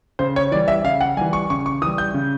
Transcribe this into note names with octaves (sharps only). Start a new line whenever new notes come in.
C#3 C5
C#5
E3 G3 D5
E5
C#3 F5
F#5
E3 G3 G#5
C#6
C#3 C#6
C#6
E3 G3 D#6
G6
C#3